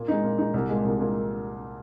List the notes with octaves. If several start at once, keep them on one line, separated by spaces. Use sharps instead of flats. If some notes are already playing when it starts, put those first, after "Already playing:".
Already playing: A#2
G#3 D#4
A#2
G#3 D#4
C2
A#2 G#3
C2
A#2 G#3